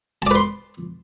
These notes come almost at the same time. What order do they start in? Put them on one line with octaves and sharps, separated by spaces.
A5 D5 B4 C6